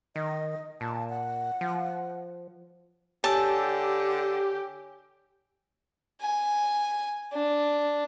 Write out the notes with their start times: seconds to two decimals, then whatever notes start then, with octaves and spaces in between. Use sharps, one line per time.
0.16 D#3 D#5
0.81 A#2 A5
1.09 F#5
1.61 F3
3.24 D3 G4 C#5 G#5 A5 E6
6.22 G#5
7.33 D4